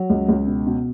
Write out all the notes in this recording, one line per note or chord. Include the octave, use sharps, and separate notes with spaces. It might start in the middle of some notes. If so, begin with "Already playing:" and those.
Already playing: F#3
C#2
C#2
B2
B2